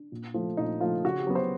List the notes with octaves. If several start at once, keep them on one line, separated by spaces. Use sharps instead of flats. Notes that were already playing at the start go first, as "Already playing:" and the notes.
Already playing: D4
A#2
F3 A3
A#2 D#4
F3 A3 F4
C#3 F#4
G4
F#3 B3
C5